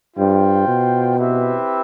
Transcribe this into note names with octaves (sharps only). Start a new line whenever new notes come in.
G2 F4 C5 G5
B2
C4 E4 G4 B4 E5